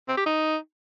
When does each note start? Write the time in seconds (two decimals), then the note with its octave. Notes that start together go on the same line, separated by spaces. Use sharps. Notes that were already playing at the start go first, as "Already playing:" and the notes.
0.08 C4
0.17 G4
0.26 D#4